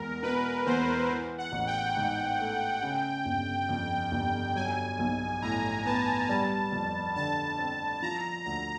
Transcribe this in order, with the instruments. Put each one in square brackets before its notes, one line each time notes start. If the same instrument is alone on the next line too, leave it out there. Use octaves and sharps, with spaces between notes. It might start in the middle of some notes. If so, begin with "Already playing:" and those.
Already playing: [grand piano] E2 G#3 [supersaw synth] A#4
[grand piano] B2 [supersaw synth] B4
[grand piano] E2 [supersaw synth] C5
[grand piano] E3
[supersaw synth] F#5
[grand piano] A1
[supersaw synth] G5
[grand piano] G#2
A3
C#3
G1
F2
G1
[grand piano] F#3 [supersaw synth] G#5
[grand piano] B1
[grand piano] A2 [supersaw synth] A#5
[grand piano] B3 [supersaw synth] A5
[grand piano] G3 [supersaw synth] A5
[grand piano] F2
[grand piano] D3 [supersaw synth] A5
[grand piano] C4
[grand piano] F3 [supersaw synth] A#5
[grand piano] D2 [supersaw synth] A#5